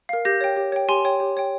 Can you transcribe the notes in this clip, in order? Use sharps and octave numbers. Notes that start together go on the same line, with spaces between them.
A#4 F5
G4 G6 A#6
C#5 G5
G4
C#5 G5
G4 G#5 C6
C#5 G5
G4
C#5 G5